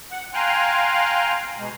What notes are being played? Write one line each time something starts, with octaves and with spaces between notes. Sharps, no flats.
F#5
F5 G5 G#5 A#5 C6 F#6
B2 G#3